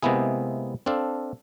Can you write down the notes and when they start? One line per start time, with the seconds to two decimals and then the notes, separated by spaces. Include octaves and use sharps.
0.03 C3 G#3 A#3 B3 E4 G#4
0.86 C4 D4 A4 F5